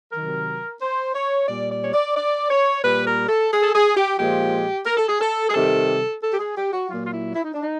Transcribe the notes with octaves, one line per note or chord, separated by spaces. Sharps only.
C3 D#3 F#3 A#4
C5
C#5
A#2 G3 D5
D5
C#5
D5
D5
C#5
A#2 G3 B4
A#4
A4
G#4
A4
G#4
G4
A#2 F3 G#3 G4
A#4
A4
G#4
A4
G#4
C3 D#3 G3 A4
A4
G4
G#4
G4
F#4
A#2 F#3 F4
F4
E4
E4
D#4
D4
D#4